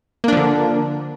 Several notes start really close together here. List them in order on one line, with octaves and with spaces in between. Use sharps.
A#3 D4 F3 D3